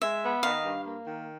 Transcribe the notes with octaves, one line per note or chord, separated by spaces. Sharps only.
G#3 E5
B3
D#3 F5
G2
A#3
D#3